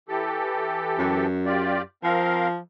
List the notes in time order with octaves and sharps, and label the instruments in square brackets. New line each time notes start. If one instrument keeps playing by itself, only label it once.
[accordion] E3 G4 A4
[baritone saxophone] F#2
[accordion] F4 G4 D5
[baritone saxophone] F3 [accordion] C4 A#4 F5